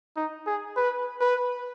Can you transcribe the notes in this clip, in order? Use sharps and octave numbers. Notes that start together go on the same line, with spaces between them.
D#4
G#4
B4
B4